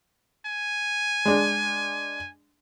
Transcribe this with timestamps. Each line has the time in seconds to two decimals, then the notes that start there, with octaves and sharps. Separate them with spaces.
0.46 G#5
1.25 G#3 D4